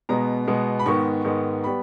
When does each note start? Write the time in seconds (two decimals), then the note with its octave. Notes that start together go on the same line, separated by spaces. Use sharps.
0.09 B2 G#3 B3 A#5
0.47 B2 G#3 B3
0.79 B5
0.86 G#2 D#3 G#3 B3 C#6
1.24 G#2 D#3 G#3 B3
1.64 G3 B3 B5